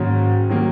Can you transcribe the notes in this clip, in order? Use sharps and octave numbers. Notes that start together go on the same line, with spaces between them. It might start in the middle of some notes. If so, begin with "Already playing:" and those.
Already playing: G#2 D#3 F#3 A#3 C#4
D#3 F#3 A#3